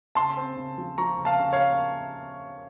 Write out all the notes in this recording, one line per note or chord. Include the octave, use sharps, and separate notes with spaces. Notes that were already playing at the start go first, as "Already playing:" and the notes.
C#3 A5 C6
C4
C#3
F3
F3 A#5 C#6
C#3
F5 A5
C#3
C#5 F5